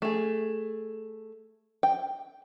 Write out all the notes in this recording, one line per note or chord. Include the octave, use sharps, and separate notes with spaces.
A3 G#4
G5